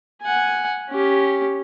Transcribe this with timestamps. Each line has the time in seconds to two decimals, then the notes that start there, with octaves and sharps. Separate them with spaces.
0.22 F#5 G#5
0.90 C#4 G4